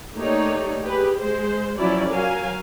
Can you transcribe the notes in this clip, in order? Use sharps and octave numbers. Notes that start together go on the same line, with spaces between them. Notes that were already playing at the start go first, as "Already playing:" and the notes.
A3 A#3 D#4 G4 C#5 D5
G4 G#4 B4
G#3 C5
F3 F#3 C#4 E4 D5
F#3 A#4 F5 G#5